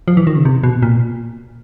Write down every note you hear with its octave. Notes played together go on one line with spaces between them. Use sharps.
F3
E3
D#3
C#3
C3
B2
A#2